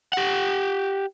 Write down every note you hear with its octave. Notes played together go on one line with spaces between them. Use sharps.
G4 F#5